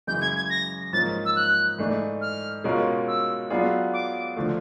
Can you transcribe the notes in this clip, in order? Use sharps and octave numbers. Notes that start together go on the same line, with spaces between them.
F#2 C#3 E3 G#3 G6
G#6
G#6
A#6
G#2 F3 A#3 C#4 A6
E6
F#6
G#2 E3 A3 D4
F6
B2 G#3 C#4 F4 A#4
E6
F#3 B3 D4 F4 G#4
D6
D3 F3 A3